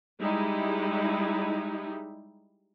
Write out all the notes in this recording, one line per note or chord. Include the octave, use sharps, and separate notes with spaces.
G3 G#3 D#4 E4